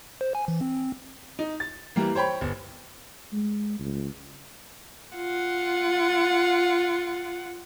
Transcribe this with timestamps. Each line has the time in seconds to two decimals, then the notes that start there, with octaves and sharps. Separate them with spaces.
0.21 C5
0.35 G#5
0.48 E3
0.61 C4
1.39 D#4
1.60 A6
1.96 E3 G3 A#3
2.15 C5 C#5 G5 B5
2.41 G1
3.33 G#3
3.79 C#2
5.15 F4 F#5